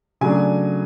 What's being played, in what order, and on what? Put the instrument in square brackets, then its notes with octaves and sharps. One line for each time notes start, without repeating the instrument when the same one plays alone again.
[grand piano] C#3 F#3 A3 D4 G#5